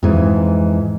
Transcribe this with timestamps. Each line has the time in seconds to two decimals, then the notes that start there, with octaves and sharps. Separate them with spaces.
0.03 F2 G#2 E3